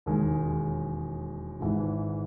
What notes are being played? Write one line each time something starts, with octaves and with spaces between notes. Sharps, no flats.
E1 D#2 D#3 G#3
G#1 G#2 E3